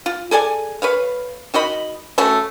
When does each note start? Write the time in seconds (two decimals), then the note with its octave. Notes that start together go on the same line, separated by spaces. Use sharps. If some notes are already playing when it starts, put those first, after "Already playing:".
0.06 F4
0.31 G#4 A4 D5 G#5
0.82 B4 C#5 F5
1.54 D#3 F#4 D#5 B5
2.18 A3 C#4 F#4 C#5